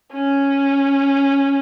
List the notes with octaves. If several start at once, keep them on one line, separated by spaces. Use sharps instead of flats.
C#4